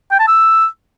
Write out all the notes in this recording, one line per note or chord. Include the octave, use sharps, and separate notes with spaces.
G5
A5
E6